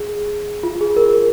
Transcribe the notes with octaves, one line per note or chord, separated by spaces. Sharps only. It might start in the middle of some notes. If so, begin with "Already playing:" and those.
Already playing: G#4
F4
G#4
A#4